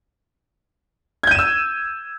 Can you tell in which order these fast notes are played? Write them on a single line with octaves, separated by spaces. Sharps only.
G#6 G6 D#7 E7 E6